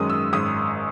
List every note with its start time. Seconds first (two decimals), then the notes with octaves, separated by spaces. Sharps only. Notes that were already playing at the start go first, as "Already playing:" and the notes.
Already playing: G#1 F#2 D#3 G#3 C#4 D#6
0.10 E6
0.33 G#1 D#6